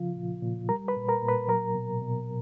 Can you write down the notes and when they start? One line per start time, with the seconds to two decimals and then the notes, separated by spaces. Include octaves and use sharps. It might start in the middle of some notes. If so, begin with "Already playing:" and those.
Already playing: C#3 F3 F4
0.16 A#2
0.42 A#2
0.69 G3 A#4 A#5
0.88 B4 B5
0.96 A#2
1.09 A#4 A#5
1.22 A#2
1.28 B4 B5
1.48 F#3 A#4 A#5
1.75 B2
2.02 B2